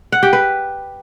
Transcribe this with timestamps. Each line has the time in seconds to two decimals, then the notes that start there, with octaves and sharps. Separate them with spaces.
0.12 F#5
0.23 G4
0.33 B4